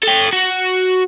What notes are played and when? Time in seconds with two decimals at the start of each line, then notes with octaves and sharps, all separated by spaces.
0.03 A4 G5
0.33 F#4